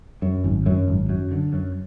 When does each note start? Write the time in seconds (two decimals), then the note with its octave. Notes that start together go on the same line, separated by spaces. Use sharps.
0.22 F#2
0.44 G#1
0.66 F#2
0.88 G#1
1.09 F#2
1.32 D3
1.53 F#2